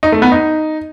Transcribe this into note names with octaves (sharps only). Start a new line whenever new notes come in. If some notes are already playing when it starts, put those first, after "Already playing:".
D#4
A3
B3
D#4